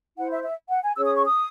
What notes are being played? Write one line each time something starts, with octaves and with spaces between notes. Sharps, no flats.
E4 C5 F#5
E5
E5
F#5
G#5
C#4 G#4 C#5 E6
D#6
C#6
D#6